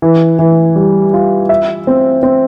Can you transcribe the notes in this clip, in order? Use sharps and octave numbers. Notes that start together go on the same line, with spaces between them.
E3
E3
G3
F4
E5
C4
C4